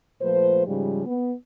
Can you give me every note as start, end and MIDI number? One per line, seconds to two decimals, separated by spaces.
0.21 0.64 46
0.21 0.64 53
0.21 0.64 57
0.21 0.64 71
0.21 0.64 72
0.66 1.06 44
0.66 1.06 49
0.66 1.06 53
0.66 1.06 55
1.06 1.33 59